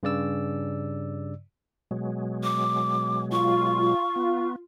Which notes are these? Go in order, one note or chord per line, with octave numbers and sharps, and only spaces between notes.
G2 C#3 D5 E6
B2 F#3 G#3
D6
F4 C#6
B3